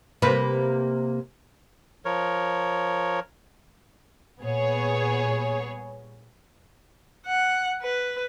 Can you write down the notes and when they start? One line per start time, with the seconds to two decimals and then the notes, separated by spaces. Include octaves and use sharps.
0.22 C3 A#3 B4
2.05 F3 A#4 C#5
4.41 A#2 G3 B3 G#4 C#5
7.26 F#5
7.82 B4